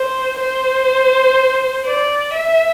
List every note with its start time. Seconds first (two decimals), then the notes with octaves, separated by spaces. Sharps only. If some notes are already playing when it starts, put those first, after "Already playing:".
Already playing: C5
0.39 C5
1.86 D5
2.34 E5